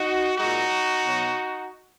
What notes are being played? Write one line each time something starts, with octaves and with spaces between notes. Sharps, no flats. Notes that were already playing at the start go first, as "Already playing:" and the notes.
Already playing: D#4 F#4
A#2 G#3 D#4 F#4
B2 F#3